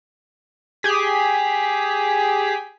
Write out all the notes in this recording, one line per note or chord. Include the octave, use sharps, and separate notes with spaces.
G4 G#4 B6